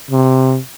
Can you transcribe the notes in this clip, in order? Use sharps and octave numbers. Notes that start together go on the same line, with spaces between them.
C3